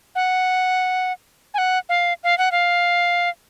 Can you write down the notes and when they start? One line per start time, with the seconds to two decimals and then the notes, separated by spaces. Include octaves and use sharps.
0.15 F#5
1.54 G#5
1.58 F#5
1.89 F5
2.24 F5
2.38 F#5
2.52 F5